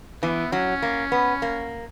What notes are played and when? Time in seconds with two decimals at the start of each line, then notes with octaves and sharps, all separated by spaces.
0.23 E3 B3
0.52 F#3 C#4
0.82 A#3
1.12 B3
1.42 A#3